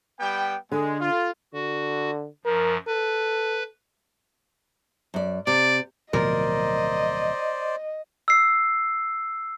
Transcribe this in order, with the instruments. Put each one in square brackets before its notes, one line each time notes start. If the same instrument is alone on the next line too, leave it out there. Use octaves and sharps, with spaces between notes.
[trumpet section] G3 B3 G5
[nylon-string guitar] D3 [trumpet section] G#3
[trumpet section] F4
[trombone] D3 [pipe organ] F#4
[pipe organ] F#2 F3 [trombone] A#4
[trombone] A4 [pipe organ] B4
[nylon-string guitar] F#2 D5
[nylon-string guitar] C3 [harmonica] D5
[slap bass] D1 B2 F3 [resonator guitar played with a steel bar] A#4 [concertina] C5 D5 [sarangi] D#5
[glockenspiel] E6 C7